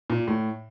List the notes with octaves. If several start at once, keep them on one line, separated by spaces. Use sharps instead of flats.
A#2
A2